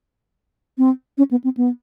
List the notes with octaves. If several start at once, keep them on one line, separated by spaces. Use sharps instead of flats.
C4
C#4
B3
C4
B3